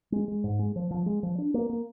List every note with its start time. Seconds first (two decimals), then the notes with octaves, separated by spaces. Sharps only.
0.12 G#3
0.28 G#3
0.44 G#2
0.59 G#3
0.76 F3
0.91 F3
1.06 G#3
1.23 F3
1.38 D4
1.54 A#3
1.69 A#3